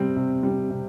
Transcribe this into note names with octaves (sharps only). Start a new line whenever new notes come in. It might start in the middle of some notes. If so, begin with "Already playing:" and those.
Already playing: C3 G3 C4
C3
G3 C4
C3